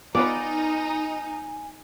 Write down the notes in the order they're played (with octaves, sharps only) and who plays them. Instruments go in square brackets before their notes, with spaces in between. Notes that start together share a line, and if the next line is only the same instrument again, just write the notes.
[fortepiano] B3 F4 B4 [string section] D#4 [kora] D5 [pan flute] G#5